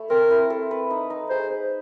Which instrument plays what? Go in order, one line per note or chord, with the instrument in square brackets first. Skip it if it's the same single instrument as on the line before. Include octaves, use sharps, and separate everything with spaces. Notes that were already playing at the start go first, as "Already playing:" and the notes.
Already playing: [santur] A3 E4
[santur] C4 [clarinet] A#4
[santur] E4
A4
B4
D#4
D#4
[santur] G#4 [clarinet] C5
[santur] B4